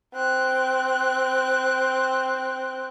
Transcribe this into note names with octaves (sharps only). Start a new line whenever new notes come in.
C4 F#6